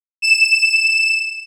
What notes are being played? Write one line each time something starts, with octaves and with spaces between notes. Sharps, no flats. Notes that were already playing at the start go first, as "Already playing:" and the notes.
E7